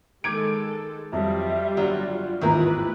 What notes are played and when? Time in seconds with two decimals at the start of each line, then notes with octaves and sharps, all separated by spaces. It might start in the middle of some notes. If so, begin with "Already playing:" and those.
0.24 D#3 G#3 A4 D6 G#6 D7
1.13 F2 F#3 G3 F4 E5
1.77 G1 F#3 F#4 D5
2.41 G#1 E2 A2 D#3 E4 F4 A#4 B4